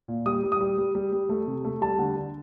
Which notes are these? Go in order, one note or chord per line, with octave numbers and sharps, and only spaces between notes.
A#2
G3 D#6
G3
D#6
G3
G3
G3
G3
A3
C3
A3
G3 A5
D3
D3